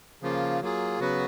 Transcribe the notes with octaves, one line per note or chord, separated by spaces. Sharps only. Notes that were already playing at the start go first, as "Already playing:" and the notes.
C#3 F3 A#3 F4
F#3 A#3 F4 G#4
C#3 F#3 B3 F#4 B4